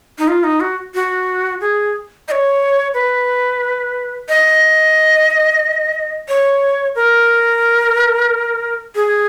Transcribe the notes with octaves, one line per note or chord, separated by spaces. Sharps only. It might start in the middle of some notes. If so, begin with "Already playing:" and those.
D#4
F4
D#4
F#4
F#4
G#4
D#5
C#5
B4
D#5
C#5
A#4
G#4